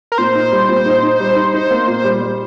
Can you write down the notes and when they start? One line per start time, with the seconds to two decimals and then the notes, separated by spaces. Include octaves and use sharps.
0.12 A#4
0.18 A#2 C5
0.35 D#4
0.52 G3
0.69 A#2
0.86 D#4
1.03 D#4
1.20 G3
1.36 D#4
1.54 D#4
1.71 A#3
1.88 A#2
2.04 G3
2.21 G3